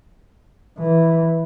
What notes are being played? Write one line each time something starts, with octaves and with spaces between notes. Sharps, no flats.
E3